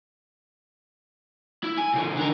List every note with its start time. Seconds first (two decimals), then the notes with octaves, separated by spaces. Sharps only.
1.63 E4
1.77 G#5
1.94 C#3 E3
2.17 D3 A#4